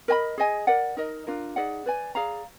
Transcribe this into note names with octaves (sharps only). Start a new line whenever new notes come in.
A#4 D#5 G#5 B5
G#4 D#5 G#5
A#4 D5 F#5
D#4 A#4 D#5
D4 F4 A#4
D#4 G#4 D5 F#5
B4 D5 G#5
G#4 D5 F5 A#5